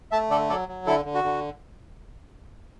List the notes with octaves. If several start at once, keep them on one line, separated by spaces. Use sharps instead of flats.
A3 E5 A5
D3 A4 D5
F#3 A4 D5
F#3
D3 E4 A4
D3
F#4
D3